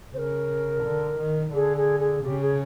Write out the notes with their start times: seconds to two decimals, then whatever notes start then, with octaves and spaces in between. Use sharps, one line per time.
0.13 C#3 A#4 C5
0.82 D3
1.18 D#3
1.53 D3 G#4
1.77 G#4
1.99 G#4
2.23 C#3 G4
2.40 G#4